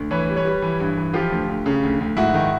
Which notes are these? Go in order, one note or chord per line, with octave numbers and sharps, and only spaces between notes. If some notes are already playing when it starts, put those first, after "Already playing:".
Already playing: D2
E3 B4 C#5
G3
B4 C#5
G3
E3
G2
E3
F3 F4 G4
D2
D2
C#3
D2
D2
G#2 E4 F#4
D#3